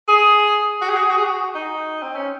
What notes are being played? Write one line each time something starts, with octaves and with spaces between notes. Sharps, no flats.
G#4
F#4
G#4
F#4
G#4
F#4
G#4
F#4
D#4
C4
C#4